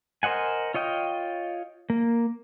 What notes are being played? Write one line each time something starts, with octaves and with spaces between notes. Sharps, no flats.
A#4 C5 D#5 F#5 G#5
F4 C#5 D#5 G5
A#3